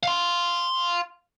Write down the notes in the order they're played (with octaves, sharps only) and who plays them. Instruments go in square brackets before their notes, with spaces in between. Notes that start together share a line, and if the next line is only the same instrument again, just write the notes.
[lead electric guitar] F5 C6